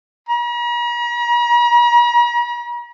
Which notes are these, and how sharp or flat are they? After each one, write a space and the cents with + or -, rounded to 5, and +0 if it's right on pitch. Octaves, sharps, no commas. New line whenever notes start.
A#5 +45